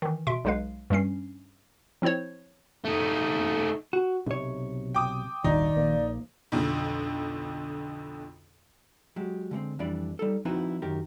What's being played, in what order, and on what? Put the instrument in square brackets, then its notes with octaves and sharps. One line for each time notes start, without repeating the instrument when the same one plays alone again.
[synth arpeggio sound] D#3 E3
B2 E5 C6 D7
B1 F#3 G#3 B4 F5
G2 G3 C#4 C7
F3 C4 E4 C5 C#5
[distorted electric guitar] A3 D#4
[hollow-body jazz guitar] F#4
[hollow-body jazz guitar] B1 C#5 [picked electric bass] C3
[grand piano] G5 D6 D#6
[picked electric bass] D#1 G#1 G2 [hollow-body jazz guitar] D#3 [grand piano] D#4 [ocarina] D5
[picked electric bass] A#1 A#2 A#3
[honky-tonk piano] B1 F2 D3
[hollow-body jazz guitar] F#3 G#3 G4
D3 G#3 A3 C4
F2 E3 G3 D4 D5 B5
G3 D#4 A4
F3 C4 D#4 E4 F#4 B4
F#2 D#3 G4 A#4